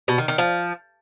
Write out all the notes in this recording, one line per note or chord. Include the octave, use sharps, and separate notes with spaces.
B2
D#3
D#3
F3